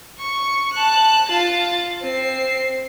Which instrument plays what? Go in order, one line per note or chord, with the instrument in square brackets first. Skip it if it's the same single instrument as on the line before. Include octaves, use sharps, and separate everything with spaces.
[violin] C#6
A5 F#6
F4 A6
C4 C7